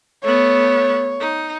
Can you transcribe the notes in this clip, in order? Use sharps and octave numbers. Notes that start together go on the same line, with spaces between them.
A3 B3 C#5
D#4